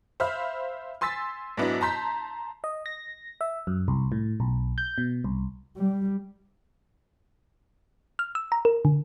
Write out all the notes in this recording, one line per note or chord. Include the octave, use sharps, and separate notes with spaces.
C5 E5 F5 B5 F6
G#5 C6 E6 A6 B6
G#2 F#3 B3 D4 E4
A5 A#5 C6 G6 B6
D#5
A#6
E5
F#2
C2
A2
B1
G6
B2
C2
G3
F6
E6
A#5
A#4
D3